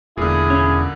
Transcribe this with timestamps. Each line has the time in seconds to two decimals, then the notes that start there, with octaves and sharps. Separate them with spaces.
0.17 E1 A#2 D3 E4 G#4
0.50 C#4